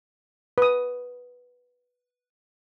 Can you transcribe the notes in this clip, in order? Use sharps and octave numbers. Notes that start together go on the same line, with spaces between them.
B4 D#6